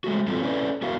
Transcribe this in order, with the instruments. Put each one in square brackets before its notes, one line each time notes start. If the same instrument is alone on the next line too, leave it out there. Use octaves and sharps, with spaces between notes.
[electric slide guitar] G#3 A3 F#4
F#3 G3 C4 F4 F#4 A4
C#4 E4 A4 B4 D5
B3 E4 F#4 A#4 F5